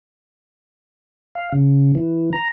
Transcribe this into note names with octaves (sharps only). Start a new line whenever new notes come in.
F5
C#3
E3
A#5